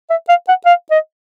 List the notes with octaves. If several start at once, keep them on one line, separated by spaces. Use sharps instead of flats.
E5
F5
F#5
F5
D#5